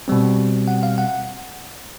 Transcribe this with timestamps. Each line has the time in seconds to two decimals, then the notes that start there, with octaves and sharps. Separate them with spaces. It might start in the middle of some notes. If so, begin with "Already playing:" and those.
0.08 B2 G3 C4
0.68 F#5
0.83 F5
0.98 F#5